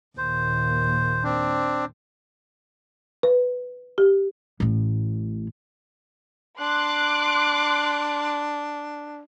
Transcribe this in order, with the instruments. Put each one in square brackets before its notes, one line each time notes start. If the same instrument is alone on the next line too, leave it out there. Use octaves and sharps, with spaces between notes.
[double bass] D#2 A#2 [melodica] C5
[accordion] C4 D4
[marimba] B4
G4
[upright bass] A1 A2
[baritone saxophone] D4 [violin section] C6 D6 F#6